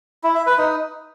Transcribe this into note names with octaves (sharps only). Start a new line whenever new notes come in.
E4
E5
B4
D#4